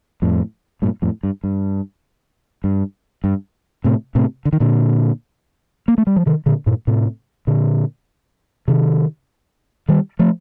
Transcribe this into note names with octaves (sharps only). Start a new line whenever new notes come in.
F2 A2
G2 A#2
F2 A2
G2
G2
G2
G2
A2 C3
A2 C3
D3
D#3
A#2 D3
A#3
A3
G3
F3
C3 D#3
A#2 D3
G2 A#2
A2 C3
A#2 D3
C3 D#3
D#3 G3
F3 A3